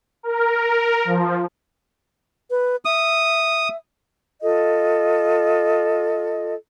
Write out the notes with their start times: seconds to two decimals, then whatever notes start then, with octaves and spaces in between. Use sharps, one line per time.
0.23 A#4
1.05 F3
2.50 B4
2.85 E5 D#6
4.41 F4 A4 D#5